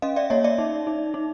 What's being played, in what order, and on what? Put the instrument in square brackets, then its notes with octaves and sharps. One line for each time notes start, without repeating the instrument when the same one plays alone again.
[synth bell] C#4 D#5 F5
D5 E5
A#3 C#5 D#5
D5 E5
D#4
D#4
D#4